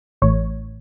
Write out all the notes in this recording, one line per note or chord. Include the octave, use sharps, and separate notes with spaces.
A1 A2 E3 A3 C#5